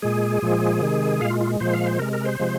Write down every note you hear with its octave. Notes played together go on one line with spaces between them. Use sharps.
A#2 G#3 G#4
A#2 F3 G#3
C3 D#3 G#3
A#2 G#3 F5
F4
F4
A#2 F3 G#3 C5
F5
C5
C3 G#3 A#4
A#4
C5
C3 F3 G#3